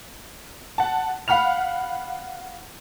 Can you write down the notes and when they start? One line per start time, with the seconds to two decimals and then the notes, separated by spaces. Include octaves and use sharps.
0.78 F#5 A5
1.28 F5 F#5 B5 F6 F7